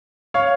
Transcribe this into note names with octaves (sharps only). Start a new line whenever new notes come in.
C#5 F5